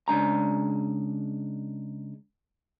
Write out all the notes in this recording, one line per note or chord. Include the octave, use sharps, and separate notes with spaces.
C#3 G#3 D4 A#5